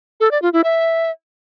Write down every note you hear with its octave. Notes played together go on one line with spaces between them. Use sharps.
A4
D5
F4
E4
E5